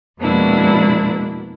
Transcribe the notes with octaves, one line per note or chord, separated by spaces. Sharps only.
F2 B2 G#3 A#3 D4 E4